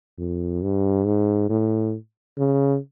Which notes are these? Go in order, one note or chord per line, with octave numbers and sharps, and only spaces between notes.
F2
G2
G#2
A2
C#3